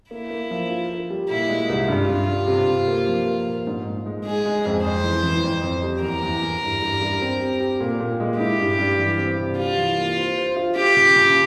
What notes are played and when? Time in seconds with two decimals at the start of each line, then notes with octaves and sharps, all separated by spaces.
0.11 A#3 E4
0.30 A#3
0.51 F3
0.70 F4
0.89 A#4
1.10 G3
1.29 A#2 E4
1.49 G#3
1.69 C2
1.88 G2 F4
2.09 G2
2.28 G3
2.47 C3
2.68 C3
2.88 A#3
3.07 F3
3.26 A#3
3.47 A#2
3.67 G#2
3.86 G#2
4.06 G#3
4.25 G#3 G#4
4.45 G#3
4.66 F2
4.85 F2 C5
5.04 E3
5.24 E3
5.44 F2
5.64 F2
5.83 G3
6.03 E2 A#4
6.23 E2
6.42 E2
6.62 G2
6.82 G2
7.01 G2
7.22 C4
7.41 G3
7.60 G4
7.80 A#2
8.00 A#2
8.20 G#3
8.39 E4 G4
8.59 G2
8.79 G2
8.99 E3
9.18 C4
9.38 C3
9.59 G3 F4
9.77 E3
9.98 A#3
10.18 C5
10.37 C5
10.56 F4
10.76 F4 G4
10.97 C#3
11.16 C#3